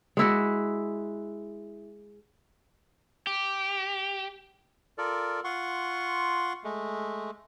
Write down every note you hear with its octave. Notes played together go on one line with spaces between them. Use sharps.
G#3 E4 F#4
G4
F4 A4 A#4 D5
F4 F#5 C6 C#6
G#3 A3